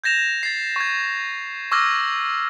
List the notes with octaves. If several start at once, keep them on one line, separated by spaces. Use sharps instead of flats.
G6 G#6 A#6 E7 F7
A6 C7
C#6 G#6
C#6 D6 E6 F6 G#6 A#6